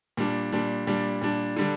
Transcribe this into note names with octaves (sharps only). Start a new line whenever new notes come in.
A#2 G3 D4
A#2 G3 D4
A#2 G3 D4
A#2 G3 D4
D3 G3 D4